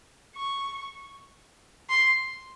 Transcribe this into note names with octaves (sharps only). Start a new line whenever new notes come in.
C#6
C6